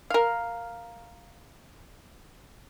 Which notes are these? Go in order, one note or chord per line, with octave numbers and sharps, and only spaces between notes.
A#4 F5